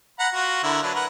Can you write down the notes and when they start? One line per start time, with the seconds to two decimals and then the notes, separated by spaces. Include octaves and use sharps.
0.19 F#5 A#5 B5
0.33 F4 F#4
0.63 D3 E4 A#4
0.83 F#3 D4 B4
0.95 A#4 B4 F#5